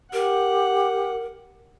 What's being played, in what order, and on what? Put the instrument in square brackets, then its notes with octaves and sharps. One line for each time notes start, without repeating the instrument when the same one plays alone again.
[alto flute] G4 [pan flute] A#4 [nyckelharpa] F#5